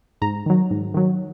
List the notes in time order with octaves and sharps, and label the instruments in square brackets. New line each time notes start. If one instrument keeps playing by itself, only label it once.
[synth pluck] G#2 A#5
D#3 F#3
G#2
D#3 F#3